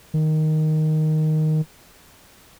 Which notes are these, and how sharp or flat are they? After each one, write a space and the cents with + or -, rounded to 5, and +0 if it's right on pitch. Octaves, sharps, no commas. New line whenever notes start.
D#3 +0